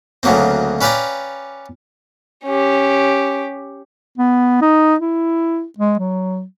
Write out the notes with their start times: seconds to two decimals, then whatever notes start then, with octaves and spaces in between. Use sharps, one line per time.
0.23 D2 C#3 F#3 A#3 C4
0.81 C#4 B4 D5 F5 G5 A#5
2.44 C#4 G4
4.18 B3
4.62 D#4
5.00 E4
5.78 G#3
5.99 F#3